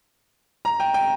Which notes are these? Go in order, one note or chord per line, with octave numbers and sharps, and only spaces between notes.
A#5
G5
G5